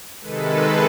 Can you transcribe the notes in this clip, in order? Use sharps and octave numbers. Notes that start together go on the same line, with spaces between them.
C3 D#3 G#3 A4 B4